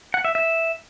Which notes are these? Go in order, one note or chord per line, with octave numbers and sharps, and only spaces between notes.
F#5
E5
E5